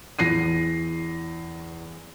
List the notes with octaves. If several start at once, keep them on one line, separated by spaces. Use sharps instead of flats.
E2 A#6 C7 D#7